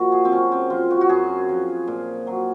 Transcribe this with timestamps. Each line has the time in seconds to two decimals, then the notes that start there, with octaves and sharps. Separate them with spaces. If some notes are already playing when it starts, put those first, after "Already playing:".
Already playing: A#2 F3 F#4
0.12 G#4
0.25 C4
0.31 F#2 C#4
0.52 C4
0.70 F3 F4
0.91 F#4
1.01 F#4
1.09 F#2 G#4
1.49 F3
1.88 A#2
2.27 F#3